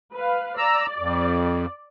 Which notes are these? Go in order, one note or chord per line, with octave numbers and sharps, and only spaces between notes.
B4 F5
D5 A#5 E6
F2